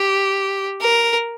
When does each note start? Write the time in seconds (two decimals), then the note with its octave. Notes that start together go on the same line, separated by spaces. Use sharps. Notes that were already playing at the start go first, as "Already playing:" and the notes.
Already playing: G4
0.81 A#4